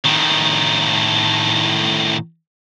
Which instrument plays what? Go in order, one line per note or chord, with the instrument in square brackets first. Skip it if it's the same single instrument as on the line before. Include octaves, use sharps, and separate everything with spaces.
[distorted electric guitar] A2 D#3